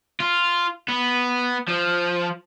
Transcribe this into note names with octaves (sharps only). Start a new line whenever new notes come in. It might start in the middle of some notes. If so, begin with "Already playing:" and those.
F4
B3
F3